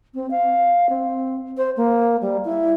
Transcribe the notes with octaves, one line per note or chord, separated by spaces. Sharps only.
C4
F5
C4
C5
A#3
G3
E4